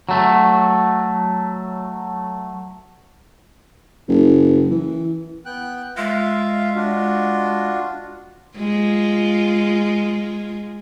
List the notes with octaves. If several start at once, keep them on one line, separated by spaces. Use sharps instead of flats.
F#3 A3
F#1
E3
B3 G5 F#6
G#3 F4 E5 F5
D4 F4 F#4
G#3 F4